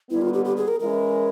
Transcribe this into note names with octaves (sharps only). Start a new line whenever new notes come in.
D#2 D3 G3 B3 E4
F4
G4
G4
G#4
A#4
E3 G#3 C#4 E4 A#4